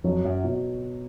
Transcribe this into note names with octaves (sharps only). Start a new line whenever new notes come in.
F2 F#3
F#2
B2